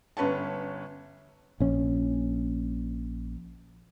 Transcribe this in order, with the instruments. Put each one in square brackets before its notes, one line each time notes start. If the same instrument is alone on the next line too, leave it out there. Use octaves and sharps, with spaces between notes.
[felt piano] G1 C#4 B4 C#5 A5
[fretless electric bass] A#1 C#4